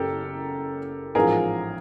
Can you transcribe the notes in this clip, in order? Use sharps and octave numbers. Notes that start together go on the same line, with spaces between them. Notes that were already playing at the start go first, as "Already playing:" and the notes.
Already playing: F#1 F#2 C#3 G4 A4 A#4
A1 G#2 F3 G#4 A#4